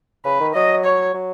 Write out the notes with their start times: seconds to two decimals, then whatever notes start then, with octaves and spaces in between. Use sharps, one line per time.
0.25 C#3 B4
0.40 D#3
0.54 F#3 D#5
0.84 C#5
1.14 F#3